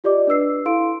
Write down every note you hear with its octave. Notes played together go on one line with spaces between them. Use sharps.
F4 G4 D5 D#5 D6
D4 B4 E6 C7
E4 A4 F5 C6 D7